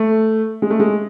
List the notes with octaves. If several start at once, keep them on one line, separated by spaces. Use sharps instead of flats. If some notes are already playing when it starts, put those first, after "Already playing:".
Already playing: A3
G#3
A3
G#3